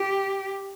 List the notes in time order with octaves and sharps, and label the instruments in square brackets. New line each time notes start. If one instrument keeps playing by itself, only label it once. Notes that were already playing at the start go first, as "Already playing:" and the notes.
Already playing: [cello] G4